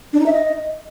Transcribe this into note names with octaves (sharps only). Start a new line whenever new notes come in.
D4
D#4
E5
D#5